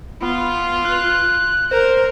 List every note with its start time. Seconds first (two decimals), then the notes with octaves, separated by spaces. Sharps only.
0.22 B3 F4
0.85 F#6
1.71 A#4 C5